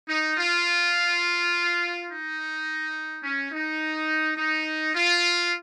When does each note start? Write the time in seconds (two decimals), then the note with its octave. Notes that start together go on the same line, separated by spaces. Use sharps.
0.09 D#4
0.38 F4
2.09 D#4
3.23 C#4
3.52 D#4
4.38 D#4
4.95 F4